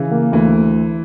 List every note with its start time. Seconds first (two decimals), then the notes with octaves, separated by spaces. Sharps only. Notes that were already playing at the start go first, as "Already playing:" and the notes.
Already playing: C#3 E3
0.11 A#3
0.32 D2 E3